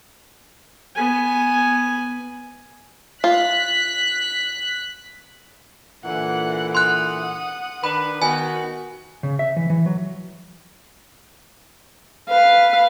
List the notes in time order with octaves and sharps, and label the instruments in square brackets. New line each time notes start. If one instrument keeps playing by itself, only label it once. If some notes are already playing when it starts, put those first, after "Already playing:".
[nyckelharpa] B3 G#5
[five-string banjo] F4 [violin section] F#6 B6
[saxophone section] A#2 D3 E3 [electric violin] F#5
[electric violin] F#5 D#6 [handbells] C6 F#6
[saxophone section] D#3 D4 B4 [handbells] B5
[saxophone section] D#3 B3 [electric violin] F#4 [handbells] G#5
[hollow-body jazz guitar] C#3
E5
E3
E3
F#3
[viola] B4 F5